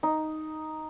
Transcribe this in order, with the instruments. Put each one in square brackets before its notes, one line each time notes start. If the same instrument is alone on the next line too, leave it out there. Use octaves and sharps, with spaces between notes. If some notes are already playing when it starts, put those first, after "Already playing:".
[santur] D#4